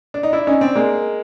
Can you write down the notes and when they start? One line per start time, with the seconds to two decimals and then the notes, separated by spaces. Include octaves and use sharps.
0.14 D4
0.23 D#4
0.33 D4 E4
0.47 C#4 D#4
0.61 C4 D4
0.75 G#3 A#3